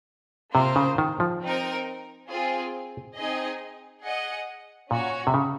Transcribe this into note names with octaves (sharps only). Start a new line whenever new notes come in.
C3 A#3 F4 C5
C#3
D#3
F3
C4 D#4 A#4
C4 F4 G#4
C4 D#4 G#4 D#5 G#5
G#4 D#5 F#5
A#2 C#4 F#4 C#5
C3
C#3